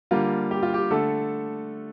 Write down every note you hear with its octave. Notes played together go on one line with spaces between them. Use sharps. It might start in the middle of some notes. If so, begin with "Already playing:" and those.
D3 G3 A#3 F4
G4
F4
G4
D3 A3 A4